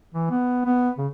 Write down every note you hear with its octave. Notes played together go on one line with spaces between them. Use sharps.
E3
B3
B3
C#3